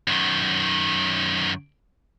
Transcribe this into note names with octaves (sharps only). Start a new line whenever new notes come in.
F#2 D#3